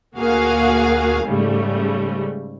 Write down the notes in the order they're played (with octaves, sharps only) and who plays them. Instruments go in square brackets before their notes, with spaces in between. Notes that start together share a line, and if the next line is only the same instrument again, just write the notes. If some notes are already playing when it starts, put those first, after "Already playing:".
[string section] D2 A#2 A#3 F#4 G#4 F5
G#2 C#3 G3 A3